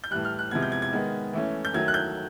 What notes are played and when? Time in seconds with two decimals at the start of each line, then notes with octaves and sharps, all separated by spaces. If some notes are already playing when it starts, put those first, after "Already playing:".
0.04 G6
0.11 A2 E3 G3 F#6
0.25 F6
0.39 F#6
0.51 C3 F3 G#3 B3 G#6
0.63 G6
0.72 G#6
0.82 G#6
0.93 D#3 G#3 B3
1.33 E3 A3 C#4
1.65 G6
1.73 D#3 F#3 A3 G#6
1.88 F#6
1.94 G6